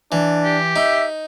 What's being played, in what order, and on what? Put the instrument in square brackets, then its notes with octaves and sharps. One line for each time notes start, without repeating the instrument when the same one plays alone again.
[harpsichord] E3 [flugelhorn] D4
[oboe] G4
[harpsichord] D#4 [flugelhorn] E5